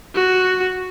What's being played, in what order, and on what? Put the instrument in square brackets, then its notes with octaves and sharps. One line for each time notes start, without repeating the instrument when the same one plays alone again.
[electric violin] F#4